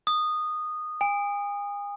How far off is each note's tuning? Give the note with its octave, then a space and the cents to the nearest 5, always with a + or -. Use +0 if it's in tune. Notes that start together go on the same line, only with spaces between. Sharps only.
D#6 -15
G#5 -40